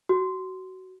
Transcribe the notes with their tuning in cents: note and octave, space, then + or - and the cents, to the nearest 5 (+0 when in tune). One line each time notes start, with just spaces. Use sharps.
F#4 +20